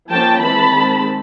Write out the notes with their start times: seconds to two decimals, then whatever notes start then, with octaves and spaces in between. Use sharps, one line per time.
0.10 F3 A#3 C#4 G5 A5
0.41 E3 G#3 C4 A5 B5
0.73 D#3 G#3 C4